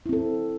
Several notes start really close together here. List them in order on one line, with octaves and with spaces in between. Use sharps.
E4 C4 A4